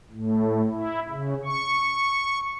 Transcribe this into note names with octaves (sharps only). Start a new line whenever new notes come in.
A2
E4
C#3
C#6